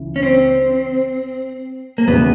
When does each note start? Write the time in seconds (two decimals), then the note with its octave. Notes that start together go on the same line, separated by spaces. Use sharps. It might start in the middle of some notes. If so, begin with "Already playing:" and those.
Already playing: C#2 C#3 E3
0.16 C#4
0.23 C4
1.98 A#3
2.07 E1 E2 C#3 B3